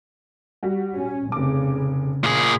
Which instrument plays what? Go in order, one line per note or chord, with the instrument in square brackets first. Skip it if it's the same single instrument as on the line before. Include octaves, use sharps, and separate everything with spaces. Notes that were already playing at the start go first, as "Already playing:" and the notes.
[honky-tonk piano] G3 F#4
[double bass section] C#4
[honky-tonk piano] F1 D6 [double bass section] C#3
[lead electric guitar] A#2 G#4